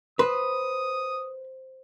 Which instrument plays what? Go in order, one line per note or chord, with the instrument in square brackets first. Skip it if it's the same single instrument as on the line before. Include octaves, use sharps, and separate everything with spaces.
[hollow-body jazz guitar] B4 [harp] C5 [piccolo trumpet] D#6